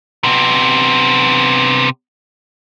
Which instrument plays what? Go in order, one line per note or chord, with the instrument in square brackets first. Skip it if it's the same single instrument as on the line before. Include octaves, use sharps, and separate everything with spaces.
[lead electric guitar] C3 B3